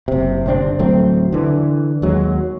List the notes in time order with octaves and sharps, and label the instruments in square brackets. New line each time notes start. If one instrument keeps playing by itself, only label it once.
[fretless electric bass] F#1 C3
G1 C3 C4 D4
D1 F#3 A3 C4
D3 E3
D#2 F#3 G#3